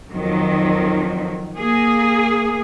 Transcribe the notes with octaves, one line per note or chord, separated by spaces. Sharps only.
F2 D#3 F#3
A#3 G#4